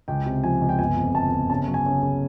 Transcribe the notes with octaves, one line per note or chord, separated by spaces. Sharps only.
C#2 G5
C3
F3 G#5
C#2
G5
G1 G#5
F2
G1 A5
G1
C#3 A5
F#3
G#5
C#3
C#3